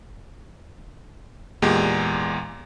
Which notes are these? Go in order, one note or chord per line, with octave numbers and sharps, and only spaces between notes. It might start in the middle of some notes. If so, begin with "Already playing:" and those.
E2 A#2 G#3 G4